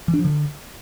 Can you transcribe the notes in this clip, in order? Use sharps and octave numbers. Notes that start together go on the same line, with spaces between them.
E3
D4
F3
D3